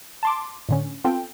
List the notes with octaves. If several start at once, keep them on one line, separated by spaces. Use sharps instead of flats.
A5 C6 D6
A2 D3 C#4
B3 C4 F4 A4 G5